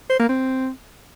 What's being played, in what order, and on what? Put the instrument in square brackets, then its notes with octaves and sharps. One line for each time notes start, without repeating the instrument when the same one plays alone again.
[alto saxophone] C5
A#3
C4